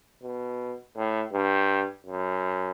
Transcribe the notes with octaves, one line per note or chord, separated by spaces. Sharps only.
B2
A2
G2
F#2